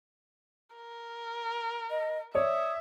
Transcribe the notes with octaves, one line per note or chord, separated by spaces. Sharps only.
A#4
D#5
C#5 D5 E5 D#6